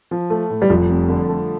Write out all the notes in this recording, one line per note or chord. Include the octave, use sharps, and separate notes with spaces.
F3
A3
A2
G3
F1 F3
F2
D3
A3